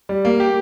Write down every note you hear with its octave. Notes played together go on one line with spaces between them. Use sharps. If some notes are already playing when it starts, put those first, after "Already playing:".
G3
A#3
G4